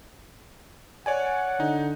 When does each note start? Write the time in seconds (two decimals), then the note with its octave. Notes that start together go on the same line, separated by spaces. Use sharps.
1.06 C#5 D5 F#5 G#5
1.60 D3 D#4